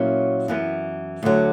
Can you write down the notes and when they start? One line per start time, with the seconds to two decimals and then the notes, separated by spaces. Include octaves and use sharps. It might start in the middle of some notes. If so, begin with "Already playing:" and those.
Already playing: A#2 F#3 C#4 E4
0.48 F#2 E3 B3
1.23 D2 D3 F#3